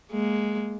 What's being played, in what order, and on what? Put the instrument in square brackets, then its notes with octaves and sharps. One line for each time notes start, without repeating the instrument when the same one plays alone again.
[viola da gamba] G#3 A#3